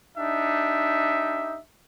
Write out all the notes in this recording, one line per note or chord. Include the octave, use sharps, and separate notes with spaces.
D4 D#4 G4 E5